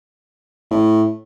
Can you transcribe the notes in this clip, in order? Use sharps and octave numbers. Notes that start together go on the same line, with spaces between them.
A2